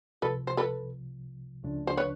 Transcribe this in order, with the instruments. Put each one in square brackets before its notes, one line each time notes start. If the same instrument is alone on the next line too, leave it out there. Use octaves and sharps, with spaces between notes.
[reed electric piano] C2 C3 F3 [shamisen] A4 B4
[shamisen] C5
A4 B4
[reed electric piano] C#2 C#3 F3 A3 D4
[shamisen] C5
B4 C#5